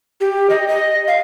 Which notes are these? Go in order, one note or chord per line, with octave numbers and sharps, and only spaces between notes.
G4
D#5
D#5
F5